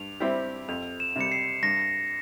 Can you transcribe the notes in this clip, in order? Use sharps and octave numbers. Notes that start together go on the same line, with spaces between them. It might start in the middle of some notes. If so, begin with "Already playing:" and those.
Already playing: G2 F7
G3 C4 E4 G4
F2 F7
E7
C3 G3 C#7
C7
G2 A#6